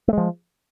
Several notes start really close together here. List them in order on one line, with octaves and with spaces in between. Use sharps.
A3 G#3 F3